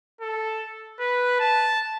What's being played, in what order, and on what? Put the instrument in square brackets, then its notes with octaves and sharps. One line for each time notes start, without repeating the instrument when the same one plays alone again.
[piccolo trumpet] A4
B4
A5